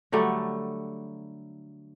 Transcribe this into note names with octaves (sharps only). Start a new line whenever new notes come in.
D3 F#3 G3 A3